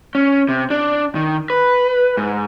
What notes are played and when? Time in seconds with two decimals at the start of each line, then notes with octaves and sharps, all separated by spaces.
0.15 C#4
0.49 C3
0.70 D4
1.15 D#3
1.50 B4
2.17 G#2